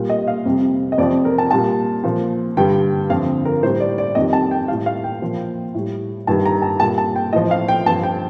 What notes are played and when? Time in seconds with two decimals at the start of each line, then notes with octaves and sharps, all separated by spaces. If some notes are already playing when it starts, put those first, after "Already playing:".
Already playing: A#2 G3
0.10 D#5
0.28 F5
0.46 F2 C3 G3
0.92 D#5
0.98 F2 C3 F3 D5
1.25 A#4
1.38 A5
1.51 A#2 G3 A5
2.04 A#2 F3
2.57 G2 D3 G3 G5
3.10 F2 D3 F3 F5
3.45 A#4
3.63 A2 C5
3.66 G3
3.80 D5
3.98 D5
4.15 F2 D#3 G3 D#5
4.33 A5
4.51 G5
4.68 G3 F5
4.72 A2
4.86 F5
5.04 G5
5.22 A#2 F3
5.74 A2 G3
6.27 G2 D#3 G3 A5
6.46 A#5
6.62 A5
6.80 A#2 G3 A5
6.98 A5
7.16 G5
7.33 A2 F3 D#5
7.51 F5
7.68 G5
7.86 G2 A5
7.89 F3
8.03 G5